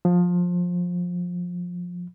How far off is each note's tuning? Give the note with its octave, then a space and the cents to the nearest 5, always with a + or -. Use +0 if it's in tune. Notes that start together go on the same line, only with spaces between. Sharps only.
F3 +20